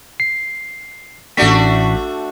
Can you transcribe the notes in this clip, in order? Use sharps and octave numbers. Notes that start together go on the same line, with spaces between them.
C7
A1 A3 D4 F#4 B6